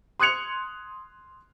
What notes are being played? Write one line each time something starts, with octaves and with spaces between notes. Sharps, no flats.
C6 D#6 F#6 G#6 C#7 F7